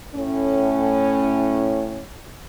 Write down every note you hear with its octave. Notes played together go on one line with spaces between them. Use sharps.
A2 C#4